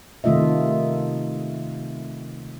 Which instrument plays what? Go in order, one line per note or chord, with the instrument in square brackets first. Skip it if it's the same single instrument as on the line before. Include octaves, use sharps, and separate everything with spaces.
[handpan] C3 D#3 A3 F4 D#5 E5